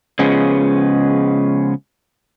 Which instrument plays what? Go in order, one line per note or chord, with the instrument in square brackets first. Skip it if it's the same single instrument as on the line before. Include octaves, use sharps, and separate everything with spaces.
[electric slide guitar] C#3 F3 G#3 B3 C#4